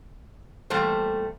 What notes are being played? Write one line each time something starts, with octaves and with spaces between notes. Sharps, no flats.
E2 A#2 G3 A3 C5